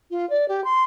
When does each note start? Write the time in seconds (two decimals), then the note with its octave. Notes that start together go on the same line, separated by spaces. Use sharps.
0.11 F4
0.30 D5
0.48 G4
0.64 C6